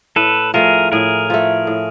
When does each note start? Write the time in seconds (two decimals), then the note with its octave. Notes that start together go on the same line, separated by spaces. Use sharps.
0.16 A2 A4 B4
0.54 F3 A3 G#4 A#4
0.92 A2 G#4 A#4
1.30 F3 A3
1.67 A2